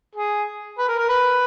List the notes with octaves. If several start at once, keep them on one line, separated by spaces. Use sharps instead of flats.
G#4
B4
A#4
A#4
B4